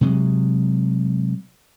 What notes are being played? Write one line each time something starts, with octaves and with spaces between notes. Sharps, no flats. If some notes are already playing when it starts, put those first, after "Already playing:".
C3 F#3 G#3